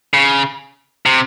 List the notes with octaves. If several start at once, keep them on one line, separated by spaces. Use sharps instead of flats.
C#3
C3